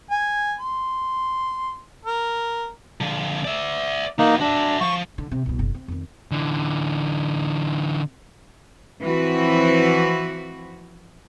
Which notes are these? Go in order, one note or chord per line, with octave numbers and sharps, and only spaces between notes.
G#5
C6
A#4
D3 F3
D5 E5
E3 A#3 D#4 F#4
D4 F#4 E5
F3 C#6
D3
C3
C2 B2
F#1
C4
F2 D#3
D3 E3
E3 F3 C4 F#4 B4